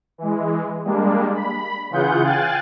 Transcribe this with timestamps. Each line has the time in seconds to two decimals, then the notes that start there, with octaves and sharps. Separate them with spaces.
0.18 E3 G#3
0.85 G3 G#3 A#3 D4
1.34 B5
1.90 C#3 E3 F4 G#4 F#5 G6
2.23 F5 G5 G#5 F#6 A6